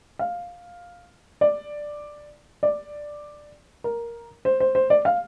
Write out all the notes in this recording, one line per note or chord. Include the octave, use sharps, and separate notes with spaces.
F5
D5
D5
A#4
C5
C5
C5
D5
F5